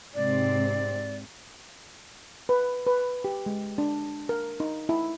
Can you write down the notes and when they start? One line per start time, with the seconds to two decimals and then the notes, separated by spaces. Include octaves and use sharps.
0.15 G#2 C3 C4 D5
2.49 B4
2.87 B4
3.24 G4
3.46 G#3
3.78 D4
4.29 A#4
4.60 D#4
4.89 E4